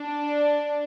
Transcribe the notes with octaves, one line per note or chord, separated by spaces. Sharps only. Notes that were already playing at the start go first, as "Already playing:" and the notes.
Already playing: D4